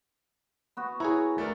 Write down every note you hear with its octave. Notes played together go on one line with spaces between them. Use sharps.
B3 F#4
E4 G#4 C#5 A#5
A3 D4 A#4